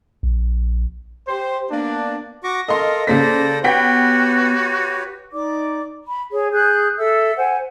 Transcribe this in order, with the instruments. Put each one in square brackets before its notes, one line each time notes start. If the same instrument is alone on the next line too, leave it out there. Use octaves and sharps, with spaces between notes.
[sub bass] A#1
[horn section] G4 C5
A#3 B3 D4
[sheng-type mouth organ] F#4 C#6 D6 [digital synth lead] A#6
[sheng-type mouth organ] A4 A#4 F5 [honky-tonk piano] D#5 C6
[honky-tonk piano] C#3 A#3 B6 [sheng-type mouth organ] A4 C5 D5
[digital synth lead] B3 [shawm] F#4 [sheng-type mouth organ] G4 B4 C#5 [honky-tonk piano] F#5 G5 B6
[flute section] D#4 D5 D6
B5
G#4 C#5
G#4 F#6 G6
A4 E5 E6
C5 F#5 G#5